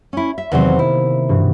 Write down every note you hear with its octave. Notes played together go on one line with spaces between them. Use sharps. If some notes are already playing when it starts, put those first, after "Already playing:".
C#4 E4
E5
E2 C3 D#3 F#3 A#3 C4
E4
G2 B2 E3